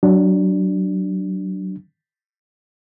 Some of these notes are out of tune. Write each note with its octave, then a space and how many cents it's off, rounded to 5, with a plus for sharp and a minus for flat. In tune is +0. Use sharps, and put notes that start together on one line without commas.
F#3 +20 D4 +0